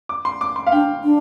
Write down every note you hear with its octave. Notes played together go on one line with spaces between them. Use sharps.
D6
C6
D6
C6
F5
D4 G5
D4